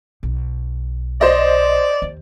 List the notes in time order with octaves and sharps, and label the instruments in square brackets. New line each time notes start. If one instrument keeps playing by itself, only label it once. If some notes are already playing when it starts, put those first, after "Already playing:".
[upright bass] B1
[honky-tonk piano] C5 D#5 [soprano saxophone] D5
[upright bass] D#2